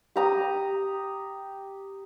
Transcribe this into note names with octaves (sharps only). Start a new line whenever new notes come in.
G4 A#5 D#6